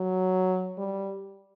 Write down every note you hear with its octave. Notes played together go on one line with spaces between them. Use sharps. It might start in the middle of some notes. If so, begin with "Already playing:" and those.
Already playing: F#3
G3